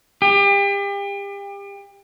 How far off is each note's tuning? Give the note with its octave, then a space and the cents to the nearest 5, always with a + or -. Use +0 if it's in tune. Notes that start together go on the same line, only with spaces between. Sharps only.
G4 +35